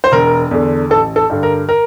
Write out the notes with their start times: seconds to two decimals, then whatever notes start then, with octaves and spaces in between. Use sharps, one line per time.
0.04 C5
0.12 E1 A#4
0.51 E2 D3
0.90 A1 A4
1.16 A4
1.30 G2 D3
1.43 A#4
1.69 A#4